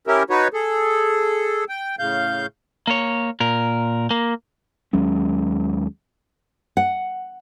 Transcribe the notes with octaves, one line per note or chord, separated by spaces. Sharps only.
C#4 E4 G4 A#4
D#4 F#4 B4 C#5
G#4 A4
G5
A2 C#3 F5 G6
A#3 C#5
A#2 A#4
A#3
D#2 F#3 G#3 C#4
F#5